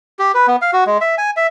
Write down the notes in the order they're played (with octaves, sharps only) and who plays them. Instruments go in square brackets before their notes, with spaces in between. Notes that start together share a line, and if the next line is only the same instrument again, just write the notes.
[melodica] G4
B4
B3
F5
F#4
G#3
E5
G#5
E5